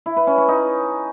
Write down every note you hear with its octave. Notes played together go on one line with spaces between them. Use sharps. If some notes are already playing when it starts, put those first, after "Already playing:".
E4
B4
C#4
C#4
D#4